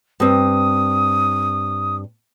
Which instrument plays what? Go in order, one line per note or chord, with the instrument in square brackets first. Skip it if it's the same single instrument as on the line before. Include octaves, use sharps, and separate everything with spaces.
[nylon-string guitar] G2 C4 [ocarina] D#6